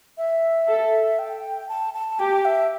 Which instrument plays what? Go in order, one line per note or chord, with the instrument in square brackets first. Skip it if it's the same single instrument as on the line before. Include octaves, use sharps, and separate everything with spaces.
[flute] E5
[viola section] A4
[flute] G5
A5
A5
[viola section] G4 [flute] G5
[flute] E5